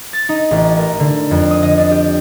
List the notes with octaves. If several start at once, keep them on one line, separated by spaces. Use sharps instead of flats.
A6
D#4
A1
A#4
D3
F2
D#6
D#5
D4
G4